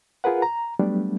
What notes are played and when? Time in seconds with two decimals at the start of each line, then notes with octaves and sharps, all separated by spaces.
0.24 F4 G#4 A#4 B4 F#5
0.42 A#5
0.79 F#3 G3 A3 B3 D4